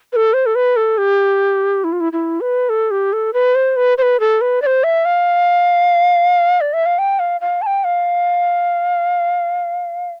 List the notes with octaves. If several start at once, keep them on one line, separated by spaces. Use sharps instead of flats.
B4
A4
C5
A4
B4
A4
G4
E4
F4
E4
E4
B4
A4
G4
A4
B4
C5
B4
C5
B4
A4
B4
D5
C5
E5
F5
D5
E5
F5
G5
F5
F5
A5
G5
F5